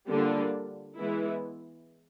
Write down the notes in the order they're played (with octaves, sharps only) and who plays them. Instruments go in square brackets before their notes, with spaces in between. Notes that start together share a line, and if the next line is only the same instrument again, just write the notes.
[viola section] D3 G3 A#3 D4 F4
E3 G#3 B3 E4